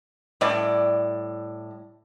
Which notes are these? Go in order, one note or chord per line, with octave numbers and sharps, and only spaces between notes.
A2 G3 D5